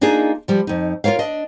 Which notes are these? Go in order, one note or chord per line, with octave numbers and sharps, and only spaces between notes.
A#3 D4 D#4 F4 G#4
F3 G3
F2 D#4
F4 F#4 A#4 C#5 F5
D4 D#5